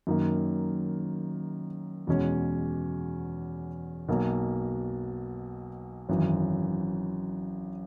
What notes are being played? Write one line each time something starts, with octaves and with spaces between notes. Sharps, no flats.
F#2 D#3 A#3
E2 B2 G#3 C#4
B1 B2 A#3
G#1 F#2 E3